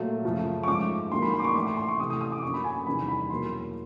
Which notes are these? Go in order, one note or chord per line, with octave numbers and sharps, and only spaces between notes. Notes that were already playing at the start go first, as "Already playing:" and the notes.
Already playing: A#2 F#3 A3
F#2 C#3 F3 A3
C#6
G#2 F3 A3 D6
G#2 D#3 F#3 A#3 C6
B5
C6
D6
C#6
A2 E3 A3 D6
C6
C6
C#6
C3 E3 A3 D#6
D#6
D#6
D6
F#2 D3 F#3 A#3 C#6
B5
G#5
E2 C3 D#3 G3 B5
B5
E2 B2 F#3 A#3 C6